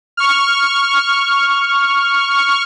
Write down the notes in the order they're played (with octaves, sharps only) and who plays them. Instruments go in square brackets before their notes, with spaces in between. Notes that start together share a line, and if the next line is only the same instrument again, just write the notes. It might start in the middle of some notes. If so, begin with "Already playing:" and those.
[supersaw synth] C#6 F6